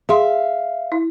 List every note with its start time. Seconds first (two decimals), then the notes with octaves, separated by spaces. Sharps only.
0.09 G#4 E5 F5 C6
0.92 E4